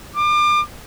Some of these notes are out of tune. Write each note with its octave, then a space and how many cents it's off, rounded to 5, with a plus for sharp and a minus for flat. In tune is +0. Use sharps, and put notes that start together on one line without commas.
D6 +35